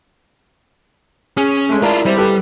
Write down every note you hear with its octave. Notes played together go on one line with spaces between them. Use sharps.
C#4 G#4
G#3 A3
E4 F4 A#4 D5 A5
G3 C4 E4
G4 A4 B4